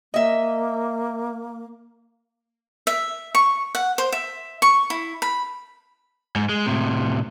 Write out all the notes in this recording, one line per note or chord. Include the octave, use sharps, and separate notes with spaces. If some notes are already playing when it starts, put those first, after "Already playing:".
A#3 D#5 E5
E5
C#6
F#5
C5
E5
C#6
E4
B5
G#2
G#3
A2 C3